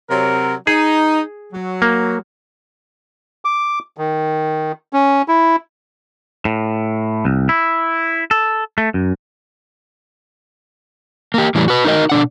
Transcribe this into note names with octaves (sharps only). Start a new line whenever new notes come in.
C3 F#3 A#4
D#4 G#4
F#3
A#3
D6
D#3
C#4
E4
A2
C2
E4
A4
A3
F#2
A#3 G4
A2 E3 G3
F#4 B4
D#4 F#4 A#4 D#5
B2 D4 F#5